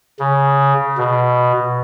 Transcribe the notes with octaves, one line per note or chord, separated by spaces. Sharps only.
C#3
B2